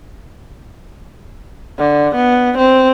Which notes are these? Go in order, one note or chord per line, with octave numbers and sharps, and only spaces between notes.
D3
B3
C4